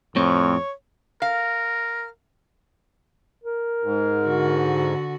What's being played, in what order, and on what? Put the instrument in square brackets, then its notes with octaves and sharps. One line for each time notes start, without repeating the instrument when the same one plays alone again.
[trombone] F2 [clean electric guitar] A2 C4 [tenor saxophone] C#5
[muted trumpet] A#4 [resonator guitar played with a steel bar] F5
[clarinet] A#4
[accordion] G#2
[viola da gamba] D3 F#4